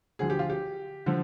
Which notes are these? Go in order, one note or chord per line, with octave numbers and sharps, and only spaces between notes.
D2 D3 F3 G#4
G4
F4
G4
D3 F3